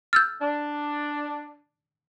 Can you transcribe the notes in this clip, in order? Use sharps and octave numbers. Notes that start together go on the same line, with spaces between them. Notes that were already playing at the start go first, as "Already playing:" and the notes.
E6 F6 G6 A6
D4